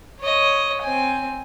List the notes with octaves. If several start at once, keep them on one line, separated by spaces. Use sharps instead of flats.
C#5 D#5
C4 G#5